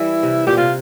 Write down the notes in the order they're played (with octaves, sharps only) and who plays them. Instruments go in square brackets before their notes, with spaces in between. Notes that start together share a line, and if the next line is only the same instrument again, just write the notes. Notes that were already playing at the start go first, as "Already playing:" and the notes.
Already playing: [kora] E3 G3 [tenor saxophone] E4
[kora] C3
[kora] A#2 [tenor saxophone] G4
[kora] C3 [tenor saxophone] F4